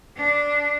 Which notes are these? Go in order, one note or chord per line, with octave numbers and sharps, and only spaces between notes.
D4